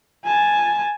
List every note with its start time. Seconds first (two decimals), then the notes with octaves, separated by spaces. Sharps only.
0.25 G#5 A5